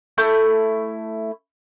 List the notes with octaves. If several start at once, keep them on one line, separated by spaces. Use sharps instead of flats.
A3 E4 G6